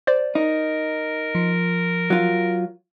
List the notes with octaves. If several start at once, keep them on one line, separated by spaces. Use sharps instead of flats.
C5 D5
D#4 A#4
F3
F#3 F4